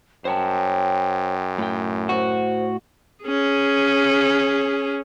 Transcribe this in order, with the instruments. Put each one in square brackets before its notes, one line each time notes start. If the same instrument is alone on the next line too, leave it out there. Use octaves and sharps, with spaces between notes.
[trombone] F#2 [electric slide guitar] C5 C#5 A5 [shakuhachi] G5
[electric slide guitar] A2 G5
[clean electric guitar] F#4 [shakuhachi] C5
[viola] C#4 G#4